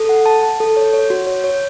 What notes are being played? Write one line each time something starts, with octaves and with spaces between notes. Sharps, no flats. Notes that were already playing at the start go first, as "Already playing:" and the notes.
Already playing: A4
F#5
A5
A5
A4
C#5
C#5
F#4
C#5
C#5